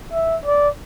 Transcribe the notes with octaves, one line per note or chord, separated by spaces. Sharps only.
E5
D5